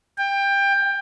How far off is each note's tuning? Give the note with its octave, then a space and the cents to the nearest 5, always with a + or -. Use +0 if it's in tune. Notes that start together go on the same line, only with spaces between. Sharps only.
G5 +20